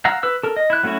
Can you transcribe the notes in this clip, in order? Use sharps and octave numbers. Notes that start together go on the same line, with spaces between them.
F5 F#5 A#5 E6
B4 E6
A4 A#4
D#5
E4 F#6
F#3 A3 C#4 E4 F#4